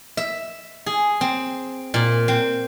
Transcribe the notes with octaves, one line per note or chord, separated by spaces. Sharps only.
E5
G#4
C4
A#2
C4